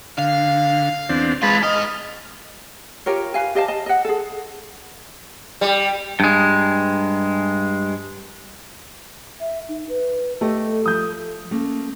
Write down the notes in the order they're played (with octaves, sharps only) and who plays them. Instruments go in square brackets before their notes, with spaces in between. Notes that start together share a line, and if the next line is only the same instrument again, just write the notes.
[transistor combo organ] D3 [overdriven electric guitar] F5
[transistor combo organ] E2 C4 D4
[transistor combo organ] G#3 A5 B5 [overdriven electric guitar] F4 B4
[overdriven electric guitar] G#2 D#5 [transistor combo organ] F6
[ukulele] F4 G4 A#4 C#5
B4 F5 G#5
G4 D#5 F5 A5
D#5 A5
D#5 F#5
G#4 A4
[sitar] G3
[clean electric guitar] G2 G#3
[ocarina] E5
D#4
B4
[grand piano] A3 [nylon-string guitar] G4 D#5 [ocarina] A4
[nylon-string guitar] F3 A3 [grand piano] D#6 G6
[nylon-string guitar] A3 A#3 [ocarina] C#4